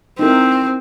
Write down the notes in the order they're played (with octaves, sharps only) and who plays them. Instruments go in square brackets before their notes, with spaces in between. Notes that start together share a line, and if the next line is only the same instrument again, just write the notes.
[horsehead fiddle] C4 [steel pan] D#4 E4 A#4